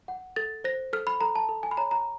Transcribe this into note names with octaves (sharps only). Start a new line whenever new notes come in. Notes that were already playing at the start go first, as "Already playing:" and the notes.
F#5
A4 A6
C5 A#6
A4 F6
B5
A4 A#5
A5
A4
G#5
B5
C#5 A#5
A#5